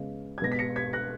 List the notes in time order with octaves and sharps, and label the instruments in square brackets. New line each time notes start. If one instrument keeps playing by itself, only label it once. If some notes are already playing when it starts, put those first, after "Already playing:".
Already playing: [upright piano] C#3 G#3 B3
G#6
B2 G#3 B3 A#6
B6
A#6 C#7
G#6 B6
F#6 A#6